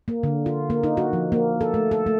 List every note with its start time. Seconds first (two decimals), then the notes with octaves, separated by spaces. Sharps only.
0.08 A#3
0.23 D3
0.46 F4
0.70 A#3
0.83 D#4
0.97 F#4
1.13 F3
1.32 A#3
1.61 A4
1.74 A3
1.91 A4
2.06 A3